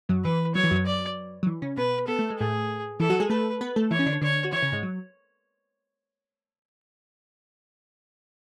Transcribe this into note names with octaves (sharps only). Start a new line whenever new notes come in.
F#2 F#3
E3 B4
F#3 C#5
E3
F#2 F#3
D5
F#3
E3
C#3 C#4
B2 B3 B4
B3 A4
A3
G#3
A2 A3 G#4
E3 E4 A4
F#3 F#4
G#3 G#4
A3 A4 B4
B3 B4
A3 A4
E3 E4 C#5
C#4
D3 D4
D3 D4 C#5
F#4
E3 E4 C#5
C#3 C#4
G#2 G#3
F#3